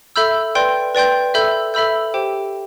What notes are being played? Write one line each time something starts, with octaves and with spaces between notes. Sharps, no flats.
A4 E5 B5 E6 G6
B4 D5 G5 C6 G6
B4 D5 G5 C6 G6
A4 E5 B5 E6 G6
A4 E5 B5 E6 G6
G4 C5 G5